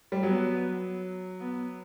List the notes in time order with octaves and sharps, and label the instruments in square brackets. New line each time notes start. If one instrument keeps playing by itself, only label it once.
[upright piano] G3
[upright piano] F#3 [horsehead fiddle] B3
[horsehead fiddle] B3